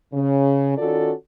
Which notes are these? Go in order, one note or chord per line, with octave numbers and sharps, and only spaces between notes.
C#3
D#3 C#4 F4 F#4 A4 D5